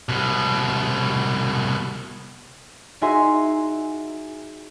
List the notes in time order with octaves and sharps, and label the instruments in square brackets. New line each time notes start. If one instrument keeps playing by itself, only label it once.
[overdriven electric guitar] C2 B2
[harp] D#4 F#4 G#4 E5 G#5 C6